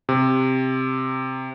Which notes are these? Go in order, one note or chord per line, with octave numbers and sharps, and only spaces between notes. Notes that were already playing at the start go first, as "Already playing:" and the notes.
C3